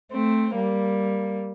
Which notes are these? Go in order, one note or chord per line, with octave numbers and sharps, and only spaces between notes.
A3 C4
G3 A#3